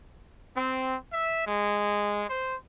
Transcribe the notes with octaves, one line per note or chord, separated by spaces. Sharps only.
C4
E5
G#3
C5